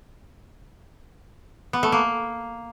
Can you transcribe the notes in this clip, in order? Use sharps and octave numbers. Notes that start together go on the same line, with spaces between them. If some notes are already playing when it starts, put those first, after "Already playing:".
B3
A3
A#3